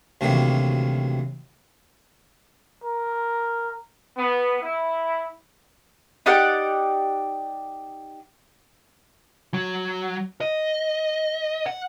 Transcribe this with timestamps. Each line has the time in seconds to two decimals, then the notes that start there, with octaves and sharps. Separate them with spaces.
0.21 D2 C3 D#3 E3 F#3 A#3
2.84 A#4
4.18 B3
4.62 E4
6.26 D#4 G4 D5 F#5
9.54 F#3
10.41 D#5
11.66 F#5